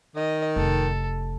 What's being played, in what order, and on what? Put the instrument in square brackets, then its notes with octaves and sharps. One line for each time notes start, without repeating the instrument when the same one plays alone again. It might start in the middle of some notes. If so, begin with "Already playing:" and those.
[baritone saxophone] D#3 [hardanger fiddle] D#5
[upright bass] F1 [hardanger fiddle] A4